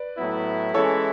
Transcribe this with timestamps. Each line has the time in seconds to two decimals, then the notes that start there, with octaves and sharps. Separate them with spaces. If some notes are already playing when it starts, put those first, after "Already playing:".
Already playing: B4 D5
0.17 A2 F#3 B3 E4
0.74 E3 G#3 C#4 E4 G#4 A4 C#5